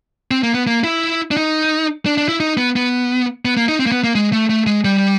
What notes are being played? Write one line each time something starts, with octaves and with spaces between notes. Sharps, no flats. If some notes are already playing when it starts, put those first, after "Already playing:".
C4
A#3
B3
A#3
E4
D4
D#4
D4
D4
E4
D#4
B3
B3
B3
A#3
D#4
C4
A#3
B3
A#3
G#3
A3
A3
G#3
G3